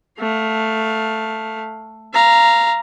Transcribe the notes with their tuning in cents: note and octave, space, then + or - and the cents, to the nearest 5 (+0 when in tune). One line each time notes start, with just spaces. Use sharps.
A3 +5 F5 +20
F5 -20 A#5 +0